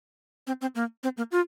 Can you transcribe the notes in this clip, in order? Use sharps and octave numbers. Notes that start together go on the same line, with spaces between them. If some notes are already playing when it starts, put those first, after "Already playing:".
C4
C4
A#3
C4
A#3
F4